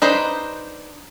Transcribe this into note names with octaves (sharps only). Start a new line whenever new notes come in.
D4 D#4 B4 C5